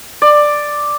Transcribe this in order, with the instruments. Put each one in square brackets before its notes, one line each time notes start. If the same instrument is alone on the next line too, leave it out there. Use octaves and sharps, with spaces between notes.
[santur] D5